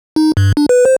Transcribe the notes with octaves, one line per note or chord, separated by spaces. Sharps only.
D#4
G2
D4
B4
C5